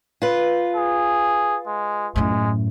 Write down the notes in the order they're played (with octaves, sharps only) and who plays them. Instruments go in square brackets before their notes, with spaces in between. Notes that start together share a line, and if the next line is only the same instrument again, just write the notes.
[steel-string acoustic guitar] F4 B4
[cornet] G#4
G#3
[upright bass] F#2 A2 [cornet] G#3